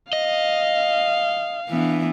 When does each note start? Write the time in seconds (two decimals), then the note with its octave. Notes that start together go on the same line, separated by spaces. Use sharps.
0.13 D#5 F5
1.69 E3 B3 D4